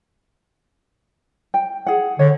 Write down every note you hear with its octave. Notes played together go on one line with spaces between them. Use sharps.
G5
G#4 F#5
D3 C#5